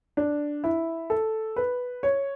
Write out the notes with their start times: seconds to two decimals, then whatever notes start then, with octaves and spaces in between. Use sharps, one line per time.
0.17 D4
0.64 E4
1.10 A4
1.56 B4
2.03 C#5